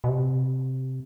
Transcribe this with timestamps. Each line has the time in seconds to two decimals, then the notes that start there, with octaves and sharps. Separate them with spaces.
0.04 B2
0.08 C3